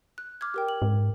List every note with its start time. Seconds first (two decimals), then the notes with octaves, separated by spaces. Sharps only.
0.18 F#6
0.41 D6 F6 G#6
0.54 G4 A#4 G5
0.68 F#7
0.82 G#2